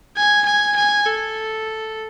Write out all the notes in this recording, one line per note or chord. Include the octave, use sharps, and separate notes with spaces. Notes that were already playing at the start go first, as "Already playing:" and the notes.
G#5
G#5
G#5
A4